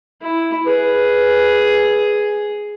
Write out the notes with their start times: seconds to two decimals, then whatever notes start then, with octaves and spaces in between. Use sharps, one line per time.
0.22 E4
0.67 G#4 B4